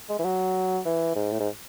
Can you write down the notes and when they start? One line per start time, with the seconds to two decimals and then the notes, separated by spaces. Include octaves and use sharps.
0.09 G#3
0.19 E3
0.25 F#3
0.85 E3
1.16 G#2
1.32 A2
1.40 G#2